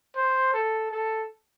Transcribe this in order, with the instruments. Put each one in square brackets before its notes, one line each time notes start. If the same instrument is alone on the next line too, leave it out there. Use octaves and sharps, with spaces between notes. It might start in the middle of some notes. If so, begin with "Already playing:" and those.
[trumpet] C5
A4
A4